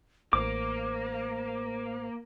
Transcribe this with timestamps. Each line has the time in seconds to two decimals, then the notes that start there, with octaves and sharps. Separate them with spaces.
0.33 A1 A#3 C5 D6